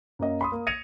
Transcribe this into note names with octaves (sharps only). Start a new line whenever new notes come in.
F#2 A#3 D#5
B5 C6 D#6
A#3
G#6 A#6 C#7 D#7 F7